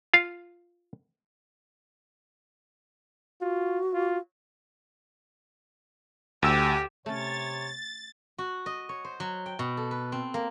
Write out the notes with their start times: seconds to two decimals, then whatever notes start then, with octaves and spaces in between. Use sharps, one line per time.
0.14 F4 F5
3.41 F4 F#4
3.94 F4
6.43 D2 G4 E6 E7
7.06 C3 A3 C#4 C#5 A6
8.38 F#4
8.66 D#5
8.89 C#5
9.04 C5
9.20 F#3
9.46 G5
9.59 B2
9.77 A4
9.91 B4
10.12 C4
10.34 A#3